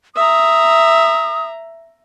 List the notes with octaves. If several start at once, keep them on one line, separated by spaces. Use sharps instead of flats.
E5 A#5 D#6